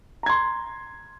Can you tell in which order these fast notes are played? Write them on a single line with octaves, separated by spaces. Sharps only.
A#5 G#6 C6